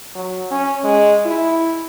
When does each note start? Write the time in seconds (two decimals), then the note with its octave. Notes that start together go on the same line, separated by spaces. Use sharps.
0.15 F#3
0.51 C#4
0.84 G#3
1.26 E4